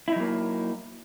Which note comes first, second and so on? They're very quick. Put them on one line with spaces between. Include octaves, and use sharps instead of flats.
E4 D#4 F#3 A#3